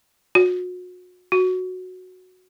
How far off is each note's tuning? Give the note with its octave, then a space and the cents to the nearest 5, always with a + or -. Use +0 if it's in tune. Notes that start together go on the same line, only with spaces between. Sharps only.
F#4 -35
F#4 -5